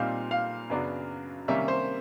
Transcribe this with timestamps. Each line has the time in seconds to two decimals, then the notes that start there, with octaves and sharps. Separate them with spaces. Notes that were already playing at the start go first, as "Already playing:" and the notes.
Already playing: A#2 G3 C4 D#4 F5
0.31 F5
0.70 F#2 C#3 F#3 B3 D4
1.48 C3 D#3 G3 A#3 C#4 E5
1.68 C5